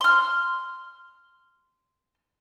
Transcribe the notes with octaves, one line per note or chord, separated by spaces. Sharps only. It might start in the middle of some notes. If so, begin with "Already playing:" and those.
C6 F6